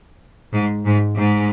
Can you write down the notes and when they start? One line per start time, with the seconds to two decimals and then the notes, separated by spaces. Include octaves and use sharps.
0.53 G#2
0.85 G#2
1.16 G#2